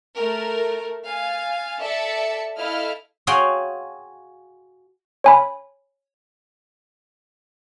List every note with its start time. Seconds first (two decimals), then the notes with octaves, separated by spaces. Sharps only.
0.16 A3 A#4
1.07 F5 G#5 A6
1.79 A4 D5 E5 A5 C#7
2.56 E4 A4 D#5 F5 F6
3.27 F#4 G#4 C#5 F5 G5 C6
5.24 C#5 G#5 B5